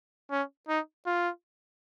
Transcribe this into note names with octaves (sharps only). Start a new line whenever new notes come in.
C#4
D#4
F4